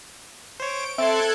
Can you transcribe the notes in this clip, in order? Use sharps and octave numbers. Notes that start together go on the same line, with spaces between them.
C5 C#5 D7
C4 A4 E5 A5 C6 F#6 G#6